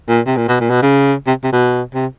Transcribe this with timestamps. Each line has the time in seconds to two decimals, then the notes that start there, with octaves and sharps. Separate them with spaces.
0.09 A#2
0.26 C3
0.37 A#2
0.48 B2
0.60 A#2
0.70 B2
0.82 C#3
1.27 C3
1.44 C3
1.52 B2
1.94 C3